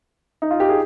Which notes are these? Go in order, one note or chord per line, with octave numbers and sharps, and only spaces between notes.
D#4
F4
G4
G#4